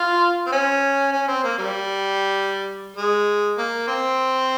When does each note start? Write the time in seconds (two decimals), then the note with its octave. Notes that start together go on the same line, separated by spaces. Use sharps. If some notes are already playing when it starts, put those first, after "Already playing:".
Already playing: F4
0.46 C4
0.52 C#4
1.12 C#4
1.28 C4
1.44 A#3
1.58 G3
2.97 G#3
3.58 A#3
3.88 C4